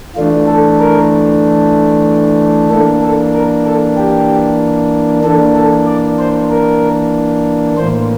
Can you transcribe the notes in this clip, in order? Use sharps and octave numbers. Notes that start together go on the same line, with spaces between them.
E3 A3 D4 F4
A4
A#4
E3 A#3 D4 A4
A4
A#4
A4
G4
E3 A#3 D4 A4
A4
D5
C5
A#4
A2 E3 A#3 C5